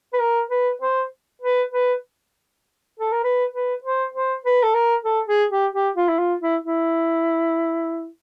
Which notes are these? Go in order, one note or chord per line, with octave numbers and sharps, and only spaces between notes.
B4
A#4
B4
C5
B4
B4
A4
A#4
B4
B4
C5
C5
B4
A4
A#4
A4
G#4
G4
G4
F4
E4
F4
E4
E4